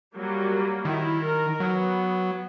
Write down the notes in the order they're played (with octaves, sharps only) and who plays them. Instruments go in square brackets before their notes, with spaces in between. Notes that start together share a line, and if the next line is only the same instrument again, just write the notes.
[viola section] F#3 G3 A#3
[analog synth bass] D#3 [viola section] E4
[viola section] A#4
[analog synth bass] F#3 [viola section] B3